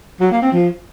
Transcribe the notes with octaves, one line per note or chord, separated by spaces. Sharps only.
F#3
A#3
C4
F3